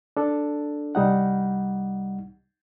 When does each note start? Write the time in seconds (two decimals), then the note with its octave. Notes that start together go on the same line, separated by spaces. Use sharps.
0.17 D4 A4
0.95 C2 G3 D#4 F#5